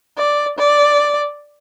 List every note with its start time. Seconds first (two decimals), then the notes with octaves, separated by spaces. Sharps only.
0.18 D5
0.58 D5